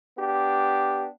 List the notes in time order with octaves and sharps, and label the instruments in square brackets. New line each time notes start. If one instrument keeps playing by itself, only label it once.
[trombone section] B3 D4 G4